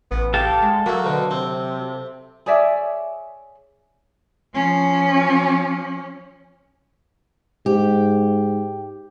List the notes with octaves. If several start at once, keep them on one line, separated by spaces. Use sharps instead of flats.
A1 B3
G4 A4 F5 A5
G#3
F#3 A3 A#3 F#4
D2 B2 D3
C3 C4
G#4 C#5 D5 E5
F3 C#4
G#2 G4